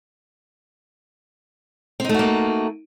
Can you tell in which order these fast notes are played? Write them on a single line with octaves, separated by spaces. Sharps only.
C4 D#4 A3 F#4 A#3